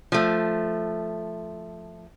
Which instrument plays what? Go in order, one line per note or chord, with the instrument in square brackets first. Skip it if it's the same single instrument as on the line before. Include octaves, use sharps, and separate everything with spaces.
[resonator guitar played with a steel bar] F3 A3